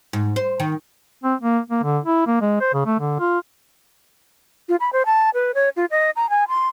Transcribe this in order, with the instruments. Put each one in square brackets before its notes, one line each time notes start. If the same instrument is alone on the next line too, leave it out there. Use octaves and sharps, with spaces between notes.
[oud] G#2
C5
D#3
[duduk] C4
A#3
A#3
D3
E4
A#3
G#3
C5
C#3
A3
D3
F4
[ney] F4
B5
C5
A5
B4
C#5
F4
D#5
A#5
G#5
C6